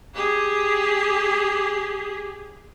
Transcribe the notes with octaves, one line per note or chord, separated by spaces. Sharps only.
G4 G#4